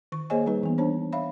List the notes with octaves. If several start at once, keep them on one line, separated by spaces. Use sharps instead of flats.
D#3 C#6
A#3 G#4 C5 C#5 D#5 G#5
G3 D#4 B4
E3 B3
D4 C5 C#5 A5
C#5 E5 F5 B5